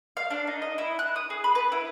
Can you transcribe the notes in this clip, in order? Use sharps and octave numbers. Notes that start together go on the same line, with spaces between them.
F5
D4
D#4
D#5
E4
F#6
D#6
G#4
B5
B4
E4